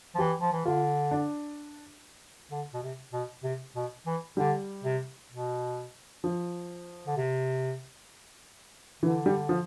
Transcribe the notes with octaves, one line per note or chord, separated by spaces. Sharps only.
F3
E3 G4
F3
E3
D3 F4
D4
D3
B2
C3
B2
C3
B2
E3
D3 G3
C3
B2
F3
D3
C3
D3 E3
G3
F3